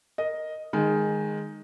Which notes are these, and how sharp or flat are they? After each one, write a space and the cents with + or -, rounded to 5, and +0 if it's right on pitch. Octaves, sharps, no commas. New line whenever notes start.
A#4 +0 D#5 +0
D#3 -10 G#3 +0